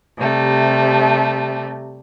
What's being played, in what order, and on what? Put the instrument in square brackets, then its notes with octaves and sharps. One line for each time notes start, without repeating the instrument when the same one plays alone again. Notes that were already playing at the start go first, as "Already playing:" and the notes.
[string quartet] C3 G3 A3